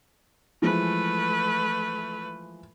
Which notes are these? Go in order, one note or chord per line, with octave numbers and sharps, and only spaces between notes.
E3 F3 G#3 A3 B4